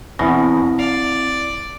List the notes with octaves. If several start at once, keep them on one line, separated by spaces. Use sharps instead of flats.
E2 B2 C4 E4 A#6
D5 F5